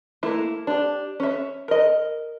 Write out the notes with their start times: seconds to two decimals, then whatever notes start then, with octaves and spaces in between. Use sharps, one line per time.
0.23 A3 A#3 E4
0.67 D4 G4
1.20 C#4 E5
1.68 A#4 D#5